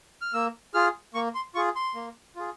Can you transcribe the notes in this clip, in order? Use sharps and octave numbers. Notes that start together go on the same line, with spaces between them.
F6
A#3 E6
F4 G#4 F6
A#3 C#6
C6
F4 G#4 C#6
C6
A#3
F4 G#4